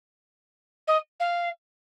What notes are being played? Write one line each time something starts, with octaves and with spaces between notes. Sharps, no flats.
D#5
F5